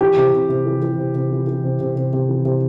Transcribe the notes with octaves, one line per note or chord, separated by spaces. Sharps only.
E3 G4
C3
C3
C3
E3
E3
C3
C3
E3
E3
C3
C3
C3
C3
E3
C3